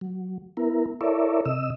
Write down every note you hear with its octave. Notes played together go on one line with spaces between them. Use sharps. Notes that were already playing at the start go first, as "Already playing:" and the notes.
F#3
B3 E4 A#4
E4 A4 A#4 C#5 D5 E5
C3 D#5 E6